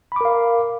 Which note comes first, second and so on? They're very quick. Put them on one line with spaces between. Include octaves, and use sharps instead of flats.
B5 D6 A#4 F5